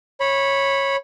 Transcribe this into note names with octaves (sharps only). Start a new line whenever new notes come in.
C#5 B5